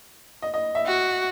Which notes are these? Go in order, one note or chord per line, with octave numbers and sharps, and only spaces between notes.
D#5
D#5
E5
F#4